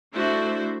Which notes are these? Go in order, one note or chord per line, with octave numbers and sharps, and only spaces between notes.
A3 D4 E4 F#4 C5 E5